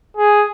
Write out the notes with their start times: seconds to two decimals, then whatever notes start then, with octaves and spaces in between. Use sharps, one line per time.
0.17 G#4